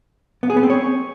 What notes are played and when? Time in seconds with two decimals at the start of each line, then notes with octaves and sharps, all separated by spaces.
0.43 B3
0.50 G#4
0.56 B3
0.63 C4
0.70 C#5